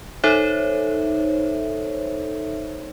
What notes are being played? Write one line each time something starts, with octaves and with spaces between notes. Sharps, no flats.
D#4 A4 C5 C#5 E5